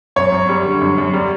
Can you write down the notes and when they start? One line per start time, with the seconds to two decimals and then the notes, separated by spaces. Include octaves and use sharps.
0.16 F#2 C#5
0.32 F#2
0.49 G3
0.65 D3
0.81 F#2
0.98 F#2
1.13 G3